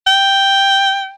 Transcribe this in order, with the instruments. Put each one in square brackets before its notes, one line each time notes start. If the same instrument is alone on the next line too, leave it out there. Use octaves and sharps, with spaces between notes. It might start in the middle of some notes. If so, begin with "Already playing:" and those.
[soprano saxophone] G5